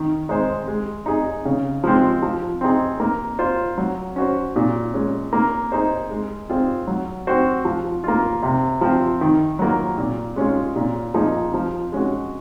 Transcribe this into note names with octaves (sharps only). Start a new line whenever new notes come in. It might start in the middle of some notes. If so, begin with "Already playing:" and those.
Already playing: D#3
G#3 D#4 G#4 C5
G#3
D#4 G#4
C#3
F3 G#3 C4
F3
C4 D#4 G#4
A#3
F4 C5
F#3
C#4 F#4 C5
A#2
G#3 C#4
A#3
D#4 G#4 C5
G#3
C4 F4 G#4 C5
F#3
C4 F#4 C5
F3
A#3 F4
C3
F3 C4
D#3
F#3 A#3 F4
A#2
G#3 C#4 F4 G#4
A#2
F3 A#3 D#4 G#4
F3
G#3 C#4 F#4